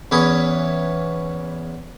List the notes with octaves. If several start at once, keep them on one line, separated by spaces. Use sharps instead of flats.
E2 E3 C#4 B4 C#5 D#6